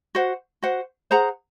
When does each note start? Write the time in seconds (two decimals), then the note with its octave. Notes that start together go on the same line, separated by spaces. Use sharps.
0.15 F#4 C5 F#5
0.62 F#4 C5 F#5
1.11 G#4 C5 F#5 A#5